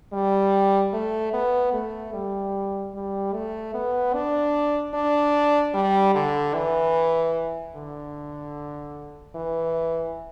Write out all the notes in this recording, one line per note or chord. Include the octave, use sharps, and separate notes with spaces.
G3
A3
B3
A3
G3
G3
A3
B3
D4
D4
G3
D3
E3
D3
E3